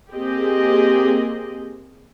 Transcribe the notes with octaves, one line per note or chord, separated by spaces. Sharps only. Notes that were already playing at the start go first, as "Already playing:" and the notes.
A#3 C4 G4 G#4 D#5